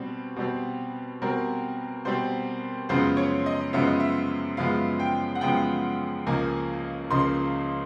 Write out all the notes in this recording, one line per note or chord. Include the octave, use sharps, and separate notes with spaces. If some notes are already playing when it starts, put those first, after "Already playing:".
Already playing: B2 G3 C4
B2 G3 C4
B2 G3 C4 A#4
B2 G3 C4 C5
F#2 C#3 F3 G#3 B3 C5
C#5
D#5
F#2 C#3 F3 G#3 B3 E5
D#5
E5
F#2 C#3 F3 G#3 B3 F5
G5
F#5
F#2 C#3 F3 G#3 B3 G5
C#2 C#3 F3 A#3 D#4 G#5
C#2 C#3 F3 A#3 D#4 C6